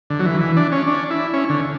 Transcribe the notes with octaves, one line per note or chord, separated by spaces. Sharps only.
D3
F#3
E3
E3
D4
C#4
D4
E4
C#4
D3